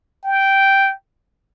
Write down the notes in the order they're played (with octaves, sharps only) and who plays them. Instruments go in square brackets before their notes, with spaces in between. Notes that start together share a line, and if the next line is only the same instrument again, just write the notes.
[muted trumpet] G5